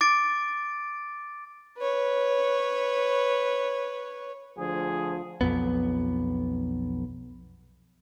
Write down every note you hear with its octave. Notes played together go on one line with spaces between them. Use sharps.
D6 A6 D7
B4 C#5
D2 F3 G#4
B1 F2 B3